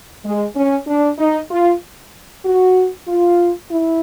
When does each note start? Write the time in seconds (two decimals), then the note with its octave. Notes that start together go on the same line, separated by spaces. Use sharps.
0.24 G#3
0.56 C#4
0.87 D4
1.19 D#4
1.51 F4
2.46 F#4
3.08 F4
3.71 E4